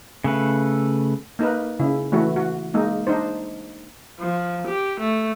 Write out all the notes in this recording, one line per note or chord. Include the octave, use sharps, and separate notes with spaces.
C#3 A3 B4
A#3 D#4 A#4 B4
C#3 E4
E3 A3 E4 F#4
F#4
G#3 A#3 D#4
D4 D#4 C5
F3
G4
A3